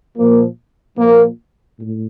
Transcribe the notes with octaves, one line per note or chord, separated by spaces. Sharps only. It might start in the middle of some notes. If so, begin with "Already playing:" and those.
A#2 F3 A#3
A#2 F3 A#3
A2